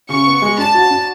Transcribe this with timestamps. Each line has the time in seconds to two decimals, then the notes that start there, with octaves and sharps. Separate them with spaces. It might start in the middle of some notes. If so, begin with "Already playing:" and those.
0.09 C#3 C#6
0.25 B3
0.42 G#3
0.58 D4 A5
0.74 F#4
0.91 D4